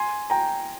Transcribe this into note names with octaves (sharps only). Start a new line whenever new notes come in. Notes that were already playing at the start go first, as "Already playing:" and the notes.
Already playing: G#5 C6
G5 A#5